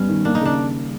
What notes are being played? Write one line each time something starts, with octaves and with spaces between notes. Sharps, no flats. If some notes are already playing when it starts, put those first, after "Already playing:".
Already playing: G2 G3 B3 C#4
D#3
A#3 D4
D#4
C#3 D4